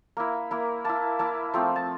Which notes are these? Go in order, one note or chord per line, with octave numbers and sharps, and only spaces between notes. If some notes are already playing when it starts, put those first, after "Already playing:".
A#3 E4
A#3 E4
A#3 E4 A5
A#3 E4 A5
F3 A3 C4
A5